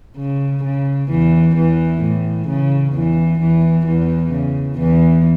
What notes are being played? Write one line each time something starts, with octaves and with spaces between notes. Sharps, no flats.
C#3
C#3
E2 E3
E2 E3
A2
C#3
E2 E3
E2 E3
E2 E3
C#3
E2 E3